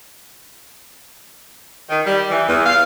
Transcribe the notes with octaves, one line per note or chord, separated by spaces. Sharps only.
D#3
G3
E3
E2
F5